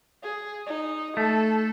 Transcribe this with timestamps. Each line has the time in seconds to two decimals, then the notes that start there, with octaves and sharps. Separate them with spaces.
0.23 G#4
0.66 D#4
1.17 A3 A4